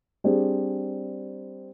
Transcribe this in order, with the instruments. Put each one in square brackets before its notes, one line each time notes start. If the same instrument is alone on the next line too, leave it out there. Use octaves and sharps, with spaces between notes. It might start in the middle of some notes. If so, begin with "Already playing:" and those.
[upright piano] G3 C4 D4 G#4 C5